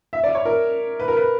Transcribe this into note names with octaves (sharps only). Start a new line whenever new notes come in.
E5
D5
C#5
A#4
B4
A#4
B4